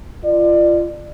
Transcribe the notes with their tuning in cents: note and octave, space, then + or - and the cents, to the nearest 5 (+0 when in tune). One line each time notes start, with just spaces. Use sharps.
F4 -30 D5 +30